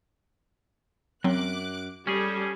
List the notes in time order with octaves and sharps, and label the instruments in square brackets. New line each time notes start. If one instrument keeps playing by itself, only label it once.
[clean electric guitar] F#2 [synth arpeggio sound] F#3 C4 [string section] D6 F#6
[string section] G3 A4 [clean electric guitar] C#4 G#4